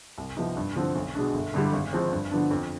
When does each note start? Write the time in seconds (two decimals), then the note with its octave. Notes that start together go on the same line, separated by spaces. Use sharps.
0.18 C2
0.37 C3 F3 B3 D#4
0.57 G2
0.76 D3 F3 C4
0.95 B1
1.15 B2 G#3 D4
1.34 G1
1.54 G2 D3 G3
1.72 G#1
1.93 G#2 F3 C4
2.12 G2
2.32 D3 F3 B3 D4
2.51 F2